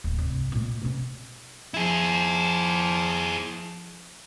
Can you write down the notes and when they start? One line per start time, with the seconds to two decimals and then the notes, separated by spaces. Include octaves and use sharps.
0.04 D1
0.19 C2 G2
0.52 A#2 A3
0.82 B2 C#4
1.74 F3 E4 G#4